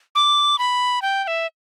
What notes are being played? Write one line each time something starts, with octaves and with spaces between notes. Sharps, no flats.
D6
B5
G5
G5
E5